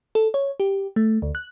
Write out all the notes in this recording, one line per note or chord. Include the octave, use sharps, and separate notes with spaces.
A4
C#5
G4
A3
D2
F#6